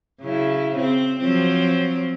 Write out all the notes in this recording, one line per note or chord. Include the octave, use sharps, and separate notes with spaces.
C#3 F#3 E4
C4
F3 F#3 C4